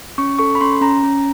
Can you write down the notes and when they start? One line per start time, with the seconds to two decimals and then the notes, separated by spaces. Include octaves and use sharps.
0.18 C#4 C#6
0.39 A4 C#6
0.55 B5
0.61 C#4 C6
0.81 C#4 A#5
1.03 C#4